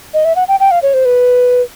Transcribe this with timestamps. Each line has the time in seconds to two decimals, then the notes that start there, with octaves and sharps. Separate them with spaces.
0.14 D#5
0.25 E5
0.36 F#5
0.48 G5
0.60 G5
0.71 F5
0.82 C#5
0.94 C5
1.05 B4